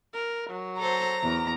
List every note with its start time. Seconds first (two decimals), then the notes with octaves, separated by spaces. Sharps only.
0.14 A#4
0.50 F#3
0.79 A4 C5 A#5
1.22 E2